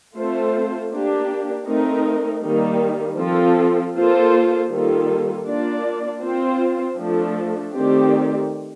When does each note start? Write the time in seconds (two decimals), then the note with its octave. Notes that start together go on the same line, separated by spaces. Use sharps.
0.15 A3 C4 F4 A4 C5
0.92 A#3 D4 G4
1.67 A3 C4 D#4 A#4
2.43 D#3 G3 A#3 D#4
3.18 F3 C4 F4 A4
3.95 A#3 F4 A4 C5
4.71 D#3 G3 A#3 F4 A4
5.46 A#3 D4 F4 A#4 D5
6.22 C4 F4 C5
6.98 F3 A3 D4 A4
7.73 D#3 A3 C4 G4 D5